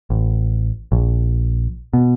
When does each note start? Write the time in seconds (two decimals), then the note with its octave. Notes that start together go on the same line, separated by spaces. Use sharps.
0.10 A1
0.92 A#1
1.93 B2